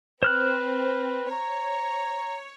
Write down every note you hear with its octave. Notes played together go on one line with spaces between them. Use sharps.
C4 B4 C5 F6 F#6
C#5 A#5